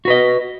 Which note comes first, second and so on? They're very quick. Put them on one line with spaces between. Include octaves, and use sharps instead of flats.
F#4 B4 D#5